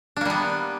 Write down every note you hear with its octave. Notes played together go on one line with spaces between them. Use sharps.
G3 A#3 B3 D4